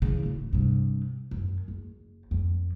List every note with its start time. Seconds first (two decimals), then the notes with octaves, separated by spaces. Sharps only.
0.02 C#3 E3
0.26 D1
0.53 G2 C3
1.31 F#2
1.68 F#1
2.31 F2